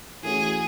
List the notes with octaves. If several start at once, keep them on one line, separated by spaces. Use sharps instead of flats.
E3 A3 C#4 F#4 G#4